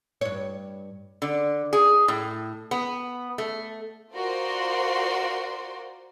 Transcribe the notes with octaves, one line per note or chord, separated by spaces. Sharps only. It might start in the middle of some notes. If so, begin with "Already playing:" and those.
G2 C#5
D3
G#4
A2
B3
A3
F4 F#4 A#4 C5 D5 C6